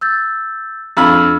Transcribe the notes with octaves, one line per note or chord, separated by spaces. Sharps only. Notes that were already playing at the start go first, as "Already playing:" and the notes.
E6 G6 A6
F2 D4 B5 E6 F6